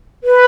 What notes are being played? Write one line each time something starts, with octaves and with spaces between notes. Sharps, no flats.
B4